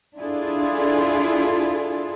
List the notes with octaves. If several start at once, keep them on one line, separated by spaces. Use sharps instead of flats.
D4 E4 F4 G#4 A4